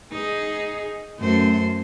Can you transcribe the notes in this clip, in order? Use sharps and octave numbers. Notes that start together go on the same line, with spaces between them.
D#4 G#4
F#2 A3 C5